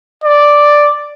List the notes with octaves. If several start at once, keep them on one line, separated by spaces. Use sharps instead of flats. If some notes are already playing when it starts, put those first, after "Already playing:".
D5